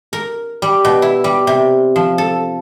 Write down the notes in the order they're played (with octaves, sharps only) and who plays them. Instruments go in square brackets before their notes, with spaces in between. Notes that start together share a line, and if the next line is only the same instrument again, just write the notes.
[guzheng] A#4
G3
B2
E4
G3
C3
F3
A4